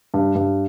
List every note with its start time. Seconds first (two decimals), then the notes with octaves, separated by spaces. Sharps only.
0.14 G2
0.35 G2